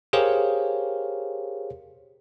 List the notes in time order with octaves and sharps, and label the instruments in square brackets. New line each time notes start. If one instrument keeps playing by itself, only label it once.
[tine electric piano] G4 G#4 A#4 C5 C#5 F5